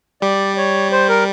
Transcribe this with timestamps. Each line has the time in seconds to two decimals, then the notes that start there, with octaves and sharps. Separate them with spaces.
0.22 G3 D5
0.57 C#5
0.92 C5
1.08 A#4